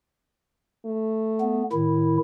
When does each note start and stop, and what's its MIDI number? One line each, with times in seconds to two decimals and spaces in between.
0.85 1.69 57
1.41 1.63 59
1.72 2.18 45
1.72 2.18 51
1.72 2.18 64